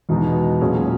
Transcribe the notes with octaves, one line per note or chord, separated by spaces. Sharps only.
E2 B2 G#3 B3 D#4
A#2 F#3 C#4 G#4